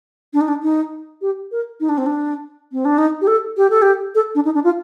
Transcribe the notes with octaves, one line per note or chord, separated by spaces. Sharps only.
D4
D#4
D4
D#4
G4
A#4
D#4
D4
C4
D4
C4
D4
D#4
G4
A4
G4
A4
G4
A4
D4
D#4
D4
F4